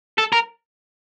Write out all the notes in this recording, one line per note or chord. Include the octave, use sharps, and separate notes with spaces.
A4
A#4